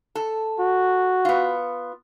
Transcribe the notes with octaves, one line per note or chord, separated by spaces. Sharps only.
A4
F#4
B3 F4